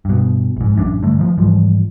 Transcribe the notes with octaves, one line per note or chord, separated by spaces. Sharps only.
G2 B2
A#1 G#2
A1 F#2 D4
G2 D3 A3
D#3 F3
G#2 E3 F3 G3